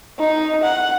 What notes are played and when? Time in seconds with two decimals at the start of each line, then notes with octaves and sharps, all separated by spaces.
0.19 D#4
0.64 F#5